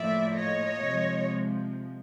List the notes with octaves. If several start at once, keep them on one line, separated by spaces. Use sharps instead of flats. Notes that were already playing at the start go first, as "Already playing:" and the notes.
Already playing: A2 F3 A#3 D5 E5
C#5 D#5
C3 F3 G#3